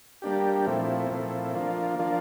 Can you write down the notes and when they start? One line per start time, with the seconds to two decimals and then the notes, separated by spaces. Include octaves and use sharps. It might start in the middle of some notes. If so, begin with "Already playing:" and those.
0.22 G3 A#3 D4 G4
0.66 A#2 F3 A3 C4 E4
1.11 A#2 F3 A3 C4 E4
1.55 F3 A#3 D4 F4
1.99 F3 A#3 D4 F4